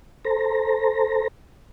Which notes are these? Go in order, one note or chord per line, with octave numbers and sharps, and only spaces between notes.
A4 C5 A#5